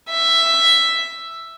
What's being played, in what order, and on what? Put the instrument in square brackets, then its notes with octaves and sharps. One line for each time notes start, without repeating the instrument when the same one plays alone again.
[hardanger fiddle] E5